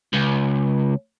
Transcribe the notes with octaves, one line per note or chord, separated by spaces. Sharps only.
C#2